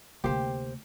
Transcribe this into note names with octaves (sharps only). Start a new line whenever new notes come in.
D2 C3 A3 A#3 G4 C5